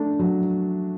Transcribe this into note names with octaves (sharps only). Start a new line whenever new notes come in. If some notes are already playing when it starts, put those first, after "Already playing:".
Already playing: A3 D4
F#3